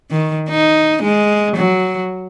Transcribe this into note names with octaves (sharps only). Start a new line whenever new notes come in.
D#3
D#4
G#3
F#3